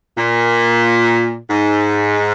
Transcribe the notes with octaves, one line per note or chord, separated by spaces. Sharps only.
A#2
G#2